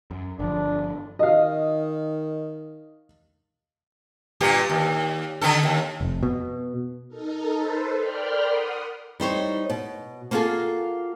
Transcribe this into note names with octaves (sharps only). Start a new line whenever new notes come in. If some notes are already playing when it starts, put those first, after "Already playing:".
F#2
G1 D3 F3 D4
D#3 D#5 F5
G2 A#2 G4
D#2
D3 D#3 A4
D#2
F1
B2
D#4 A4 A#4
A4 B4 C5
A#4 D5 G5 B5 C6 F6
F#5 D#6
G3 D#4 C5 C#5
B2
A#3 B3 F4 F#4 G#4 A4